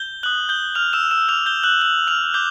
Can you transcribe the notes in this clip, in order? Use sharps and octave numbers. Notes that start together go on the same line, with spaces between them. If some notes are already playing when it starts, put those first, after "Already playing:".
Already playing: G6 G7
D#6 F#6 F#7
G6 G7
F6 F7
E6 E7
E6 E7
D6 F6 G6 F7
G6 G7
F#6 F#7
F#6 F#7
F6 F7
D6 G6 G7